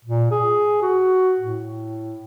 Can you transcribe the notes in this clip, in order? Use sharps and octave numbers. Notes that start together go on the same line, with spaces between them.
A#2
G#4
F#4
A2